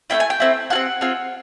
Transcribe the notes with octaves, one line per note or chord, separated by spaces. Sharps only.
A3 C4 E4 G5
G#5
G5
A3 C4 E4
F4 G#4 F#5
C4
C4 F4 G#4